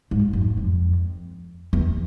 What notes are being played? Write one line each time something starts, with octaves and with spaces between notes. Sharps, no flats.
G#2
F#2
F2
E2